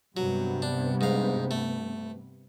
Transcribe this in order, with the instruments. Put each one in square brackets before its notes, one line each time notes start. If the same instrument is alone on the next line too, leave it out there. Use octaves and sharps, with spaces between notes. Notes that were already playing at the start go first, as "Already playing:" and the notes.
[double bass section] G2 C3 B3 [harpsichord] F#3
[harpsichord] D4
G#2 F5
A3